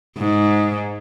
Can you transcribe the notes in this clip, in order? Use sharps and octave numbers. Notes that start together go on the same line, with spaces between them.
G#2